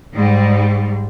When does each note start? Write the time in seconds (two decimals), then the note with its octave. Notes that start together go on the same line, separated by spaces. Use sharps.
0.14 G#2 G3